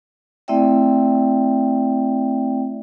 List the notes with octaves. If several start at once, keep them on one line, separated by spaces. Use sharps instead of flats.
A3 C4 E4 D5 E5 G5